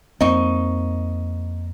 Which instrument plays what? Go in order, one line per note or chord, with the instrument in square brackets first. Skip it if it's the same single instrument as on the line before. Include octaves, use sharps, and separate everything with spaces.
[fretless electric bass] F2 A#3 C4 [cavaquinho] D#4 D#5 C#6